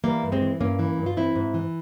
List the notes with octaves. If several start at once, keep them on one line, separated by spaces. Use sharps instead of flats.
E3 G3 A#3
G2
G#3 C4
E3
G2 A#3 C#4
E3
G2
F4
E3 C4 E4
G#2
E3